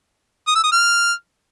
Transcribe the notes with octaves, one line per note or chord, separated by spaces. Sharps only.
D#6
E6
D#6
F6